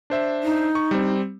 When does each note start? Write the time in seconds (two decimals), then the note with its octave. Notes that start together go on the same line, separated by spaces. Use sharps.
0.10 D4 C5 E5
0.43 D#4
0.75 C#6
0.91 G3 C4